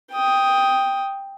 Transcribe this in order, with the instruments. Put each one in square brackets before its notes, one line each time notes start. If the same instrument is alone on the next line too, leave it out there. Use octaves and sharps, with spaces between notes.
[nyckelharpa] G5 D#6